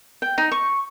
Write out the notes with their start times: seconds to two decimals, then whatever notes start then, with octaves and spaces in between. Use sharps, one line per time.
0.22 G5
0.38 D#4
0.52 C#6